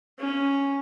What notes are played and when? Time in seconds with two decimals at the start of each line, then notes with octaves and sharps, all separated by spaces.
0.19 C#4